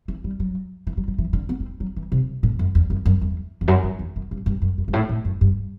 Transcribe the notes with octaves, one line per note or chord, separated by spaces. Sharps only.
E3
G3
F#3
E3
F#3
F#3
E3
D3
B3
C4
F#3
E3
C3
A2
F#2
E2
F#2
F#2
E2
E2
F#2
G2
E2
F#2
G2
G2
F#2
F#2
G2
A2
A2
F#2
G2